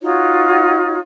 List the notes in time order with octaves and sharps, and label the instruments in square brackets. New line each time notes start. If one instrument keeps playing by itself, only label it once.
[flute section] D#4 F4 F#4 C#5